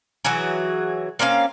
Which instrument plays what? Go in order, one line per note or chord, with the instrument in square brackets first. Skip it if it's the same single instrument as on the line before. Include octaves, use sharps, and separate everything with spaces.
[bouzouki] E3 F#3 F#4 G#4
A#3 C4 C#4 F5